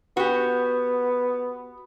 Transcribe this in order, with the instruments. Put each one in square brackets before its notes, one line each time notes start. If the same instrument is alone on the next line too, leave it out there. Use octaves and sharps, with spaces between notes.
[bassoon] B3 [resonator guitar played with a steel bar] F#4 G4